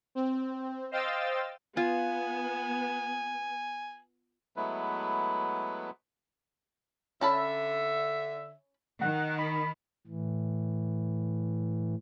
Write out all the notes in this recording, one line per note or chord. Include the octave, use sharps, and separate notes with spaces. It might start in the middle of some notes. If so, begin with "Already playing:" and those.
C4
C5 D#5 F5 G5 E6 A6
B3 F4 G#5
F#3 G#3 A3 B3 E4 B4
D3 C#4 E5 A5 B5
D#3 F#5
B5
A2 E3